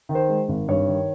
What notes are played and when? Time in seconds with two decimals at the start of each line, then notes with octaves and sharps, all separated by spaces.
0.09 D#3
0.15 C5
0.28 G#3
0.49 G#1
0.68 G2 C#5
0.88 D#3